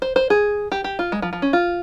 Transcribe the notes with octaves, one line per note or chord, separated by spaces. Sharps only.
C5
C5
G#4
G4
G4
F4
G#3
F3
F3
C#4
F4